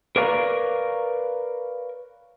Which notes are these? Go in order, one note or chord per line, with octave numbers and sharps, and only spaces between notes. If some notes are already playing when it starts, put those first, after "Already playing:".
A#4 B4 C#5 D5 F5 A#5